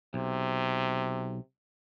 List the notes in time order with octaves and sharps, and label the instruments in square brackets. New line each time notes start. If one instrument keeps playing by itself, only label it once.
[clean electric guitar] B1 [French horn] C3